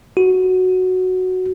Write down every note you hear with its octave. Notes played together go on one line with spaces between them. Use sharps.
F#4